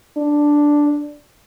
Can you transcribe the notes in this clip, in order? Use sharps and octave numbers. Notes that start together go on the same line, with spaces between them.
D4